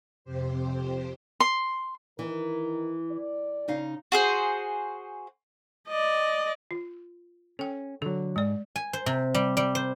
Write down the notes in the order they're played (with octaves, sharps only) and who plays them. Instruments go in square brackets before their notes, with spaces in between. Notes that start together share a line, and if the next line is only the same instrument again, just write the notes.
[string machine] F2 C3 G4 C5
[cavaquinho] C6
[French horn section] D#3 A#4 [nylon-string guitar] E3
[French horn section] D5
[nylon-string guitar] C#3 D#4 F5
[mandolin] F#4 G#4 C5
[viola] D5 D#5
[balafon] F4
[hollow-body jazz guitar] C#4 [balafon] A4 G5
[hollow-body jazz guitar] D3 F#3 [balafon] A4
[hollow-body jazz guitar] G#2 [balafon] G#3 D5
[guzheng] G#5
C5
C3
G3
G3
C5